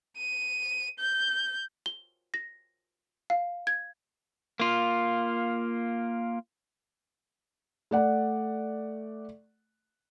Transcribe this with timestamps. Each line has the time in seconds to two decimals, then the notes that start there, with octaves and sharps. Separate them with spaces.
0.17 D#7
0.99 G6
1.86 G7
2.34 A#6
3.30 F5
3.67 G#6
4.60 A#3 F4
7.91 A3 D5 F#5